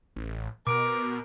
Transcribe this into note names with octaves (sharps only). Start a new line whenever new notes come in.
A1
B2 A#4 D6 D7